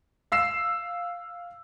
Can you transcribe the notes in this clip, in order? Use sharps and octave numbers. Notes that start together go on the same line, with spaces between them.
F5 E6 C7 E7